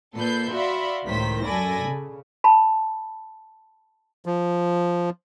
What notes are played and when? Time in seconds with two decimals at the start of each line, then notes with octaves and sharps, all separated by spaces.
0.15 A#2 A4 B4 G6 C7
0.52 F#4 D5 E5 F5 B5 C6
1.04 C#2 A2 D#3 C5 B6
1.43 F#2 A4 D5 G#5 B5 A#6
1.85 C#3
2.44 A5 B5
4.26 F3